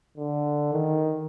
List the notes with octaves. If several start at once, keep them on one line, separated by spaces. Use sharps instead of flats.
D3
D#3